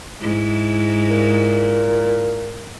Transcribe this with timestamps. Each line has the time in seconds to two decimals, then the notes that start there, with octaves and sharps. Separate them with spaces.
0.21 G#2 E4
1.10 A#2